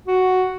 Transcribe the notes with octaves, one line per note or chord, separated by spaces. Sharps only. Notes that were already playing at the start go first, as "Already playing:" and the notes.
F#4